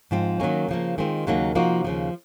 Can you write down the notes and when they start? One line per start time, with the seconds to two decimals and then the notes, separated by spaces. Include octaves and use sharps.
0.11 G#2 F3 C4
0.40 D#3 F#3 A#3 C#4
0.68 C#3 F3 A#3
0.98 D#3 G#3 C4 F4
1.27 D#2 C#3 F#3 A#3 D#4
1.55 C3 F3 A#3 D#4 F#4
1.84 D#2 C#3 F3